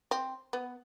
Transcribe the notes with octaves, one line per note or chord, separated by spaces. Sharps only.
C4
B3